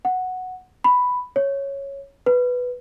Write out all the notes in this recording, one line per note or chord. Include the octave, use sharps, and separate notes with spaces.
F#5
B5
C#5
B4